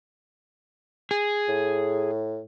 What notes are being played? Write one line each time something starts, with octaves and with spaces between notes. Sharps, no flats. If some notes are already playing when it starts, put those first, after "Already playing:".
G#4
A2